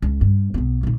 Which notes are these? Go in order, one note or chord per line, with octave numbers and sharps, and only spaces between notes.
C#2
G2
B1 B3
A#2 D#4